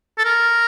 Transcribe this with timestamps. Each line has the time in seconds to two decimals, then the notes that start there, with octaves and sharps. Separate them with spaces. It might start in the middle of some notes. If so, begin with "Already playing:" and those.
0.18 A4
0.25 A#4